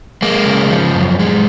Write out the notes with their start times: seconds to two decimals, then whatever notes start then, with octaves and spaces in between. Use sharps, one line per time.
0.22 G#3 A#3
0.46 C#3
0.70 F3
0.94 F#2
1.19 G#3